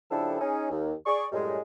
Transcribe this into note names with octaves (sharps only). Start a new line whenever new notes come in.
C#3 F3 D4 E4 G4 A4
C#4 D#4 G#4
D#2
G#4 D5 C#6
F#2 A2 G3 G#3